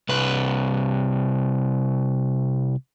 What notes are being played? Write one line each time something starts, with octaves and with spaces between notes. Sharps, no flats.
C2 B4